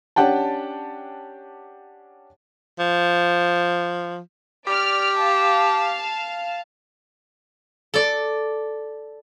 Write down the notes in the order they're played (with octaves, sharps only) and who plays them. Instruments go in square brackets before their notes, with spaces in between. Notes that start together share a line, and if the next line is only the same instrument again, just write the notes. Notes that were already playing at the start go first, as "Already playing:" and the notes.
[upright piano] C#4 D4 G4 F#5 G5 A5
[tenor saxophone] F3
[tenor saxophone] G4 [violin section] D5 F6
[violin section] F5 A5
[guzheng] A4 D5